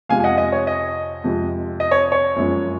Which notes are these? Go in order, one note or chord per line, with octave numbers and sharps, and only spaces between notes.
F2 C3 F3 G#3 F5 G#5
G#5
D#5 F#5
D#5
C#5
D#5
F2 C3 F3 G#3
D#5
C#5
C#5
F#2 F3 G#3